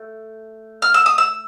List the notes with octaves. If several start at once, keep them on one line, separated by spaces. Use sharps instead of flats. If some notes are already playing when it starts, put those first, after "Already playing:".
Already playing: A3
F6
E6
D#6
E6